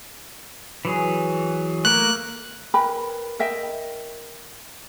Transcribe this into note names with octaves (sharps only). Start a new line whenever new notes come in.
E3 F#3 G#4
A3 A#3 A#4 F#6
A#4 B4 G5 B5
A#4 D#5 E5 G5